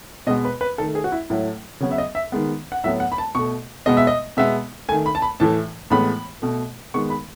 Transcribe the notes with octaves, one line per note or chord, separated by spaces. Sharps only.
B2 G#3 B3 D#5
B4
B4
D#3 A3 A4
G#4
F#4
E4
A2 F#3 A3 E4
C#3 F#3 B3 C#5
E5
D#5
E5
D#3 G#3 B3
F#5
A2 F#3 B3 E5
F#5
B5
A5
B2 A3 C#6
B2 G#3 B3 D#5
E5
D#5
B2 G#3 B3 E5
D#3 A3 G#5
B5
A5
B5
A2 E3 A3 A5
A2 E3 G#3 B3 B5
B2 A3
D#3 G#3 B3 C#6
B5